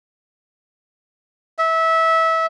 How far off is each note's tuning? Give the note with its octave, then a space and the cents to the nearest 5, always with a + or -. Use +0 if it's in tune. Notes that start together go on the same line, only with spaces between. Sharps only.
E5 -20